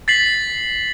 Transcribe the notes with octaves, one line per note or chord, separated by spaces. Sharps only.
A6 B6 C7 F#7